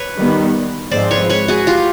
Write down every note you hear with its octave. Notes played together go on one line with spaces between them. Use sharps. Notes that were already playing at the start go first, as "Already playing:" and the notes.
Already playing: B4 C#5
D#3 G3 B3
G#2 F3 G#3 C4 C5 D5
B4 C#5
B4 C#5
F#4 G#4
F4 G4